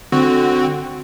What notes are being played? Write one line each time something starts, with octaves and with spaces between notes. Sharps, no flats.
D3 C4 F#4